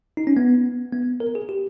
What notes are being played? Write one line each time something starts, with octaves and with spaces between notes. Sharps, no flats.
D#4
C#4
B3
B3
A#4
G#4
G4